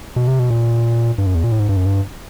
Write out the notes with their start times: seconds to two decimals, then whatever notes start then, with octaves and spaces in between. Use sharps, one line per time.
0.16 B2
0.28 C3
0.39 B2
0.50 A#2
1.18 G2
1.26 F#2
1.35 E2
1.44 A#2
1.52 A2
1.60 G#2
1.69 G2
1.77 F#2
1.86 G2